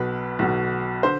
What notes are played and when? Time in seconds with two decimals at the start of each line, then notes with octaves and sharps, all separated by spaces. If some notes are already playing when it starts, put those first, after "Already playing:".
Already playing: B1 B2 B4
0.39 B1 B2
1.03 D3 C5